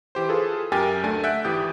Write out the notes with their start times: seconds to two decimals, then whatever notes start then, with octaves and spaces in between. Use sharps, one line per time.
0.15 E3 G4 C5
0.28 F4 G#4 A4 B4
0.72 F#2 G4 A#4 G5 G#5 A6
1.03 D2 A3 D4 G#5 A6
1.24 E5 F#5 F#6 G6 D7
1.44 G#1 E3 G4 D#6 G6